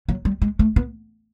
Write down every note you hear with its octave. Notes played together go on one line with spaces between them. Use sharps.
F#3
G3
G#3
A3
B3